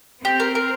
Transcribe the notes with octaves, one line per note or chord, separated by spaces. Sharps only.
C4 G4
A#4
A#4